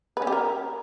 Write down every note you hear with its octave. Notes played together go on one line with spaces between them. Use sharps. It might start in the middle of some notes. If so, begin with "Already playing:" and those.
B4
C#4
G4
A#4